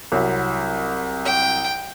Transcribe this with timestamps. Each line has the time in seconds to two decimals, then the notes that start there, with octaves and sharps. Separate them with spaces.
0.12 C2 F#3
1.25 G5